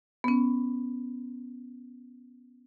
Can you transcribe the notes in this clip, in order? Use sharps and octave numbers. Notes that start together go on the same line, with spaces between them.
B3 C#4